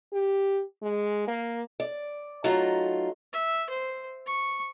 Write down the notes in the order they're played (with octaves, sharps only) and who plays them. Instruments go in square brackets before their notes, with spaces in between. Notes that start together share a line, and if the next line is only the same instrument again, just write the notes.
[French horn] G4
G#3
A#3
[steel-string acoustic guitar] D5
F#3 A3 D#4 F4
[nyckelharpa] E5
C5
C#6